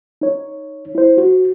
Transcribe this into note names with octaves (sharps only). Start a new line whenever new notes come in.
D#4 C#5
E4 C5
F#4